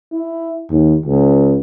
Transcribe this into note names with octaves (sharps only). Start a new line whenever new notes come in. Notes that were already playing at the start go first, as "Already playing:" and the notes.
E4
D#2
C#2